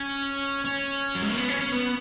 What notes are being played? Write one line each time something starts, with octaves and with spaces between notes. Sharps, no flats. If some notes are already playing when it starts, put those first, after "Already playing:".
Already playing: C#4
C#4
F#3
G#3
A#3
B3
C#4
C#4
B3